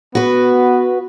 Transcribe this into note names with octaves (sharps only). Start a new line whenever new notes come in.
B3 F#4 B4